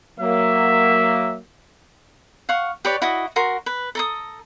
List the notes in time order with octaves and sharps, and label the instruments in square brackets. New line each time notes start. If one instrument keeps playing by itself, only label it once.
[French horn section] F#3 A#3 [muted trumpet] E5
[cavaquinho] F5 F#5 C#6
G4 B4 C#5 D5
E4 F#4 D#5
F#4 A#4 C6
B4
A4 A#5 D#6